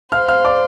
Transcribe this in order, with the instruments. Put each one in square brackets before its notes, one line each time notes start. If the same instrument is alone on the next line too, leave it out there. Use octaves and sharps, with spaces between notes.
[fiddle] C5 [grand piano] F5 F6
[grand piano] F5 F6
D5 D6